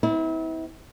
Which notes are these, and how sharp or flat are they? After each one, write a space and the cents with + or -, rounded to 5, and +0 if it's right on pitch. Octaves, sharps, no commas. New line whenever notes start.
B3 +45 E4 -35